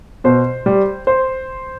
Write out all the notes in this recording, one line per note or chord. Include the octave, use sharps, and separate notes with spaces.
B2 C5
G3
C5